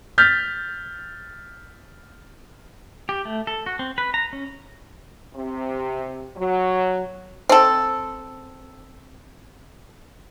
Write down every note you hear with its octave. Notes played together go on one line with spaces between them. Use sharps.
F6 G6 A6 B6
G4
A3
A4
F#4
C4
B4
A#5
C#4
C3
F#3
C4 A4